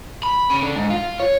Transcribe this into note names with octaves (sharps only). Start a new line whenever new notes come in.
B5
C#3
D3
G#2
F4
C#5